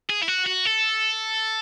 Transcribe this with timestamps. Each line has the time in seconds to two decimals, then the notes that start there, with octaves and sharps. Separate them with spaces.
0.10 G#4
0.23 E4
0.28 F#4
0.46 F#4
0.66 A4